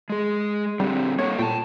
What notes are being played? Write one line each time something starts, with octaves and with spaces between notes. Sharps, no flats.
G#3 G#4
D3 G3 C4
A#3 A4 C#5 F#5
A#2 G5 A5